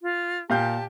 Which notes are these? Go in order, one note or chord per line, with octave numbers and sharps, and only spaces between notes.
F4
A#2 G4 F5 A5 G6